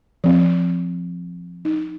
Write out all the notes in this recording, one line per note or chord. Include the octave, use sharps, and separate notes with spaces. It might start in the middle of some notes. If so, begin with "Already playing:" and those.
F3 C4
D#4